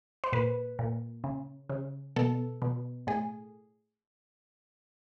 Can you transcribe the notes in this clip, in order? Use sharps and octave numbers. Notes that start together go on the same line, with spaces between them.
C5
A#2 B4
A#2
C#3
C#3
B2 A4
B2
A2 G#4